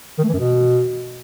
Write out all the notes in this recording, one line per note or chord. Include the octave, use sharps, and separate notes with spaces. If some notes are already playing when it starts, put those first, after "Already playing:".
D#3
A3
E3
F#2
B2